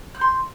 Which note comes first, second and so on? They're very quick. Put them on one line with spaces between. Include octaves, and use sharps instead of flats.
F#6 G6 C6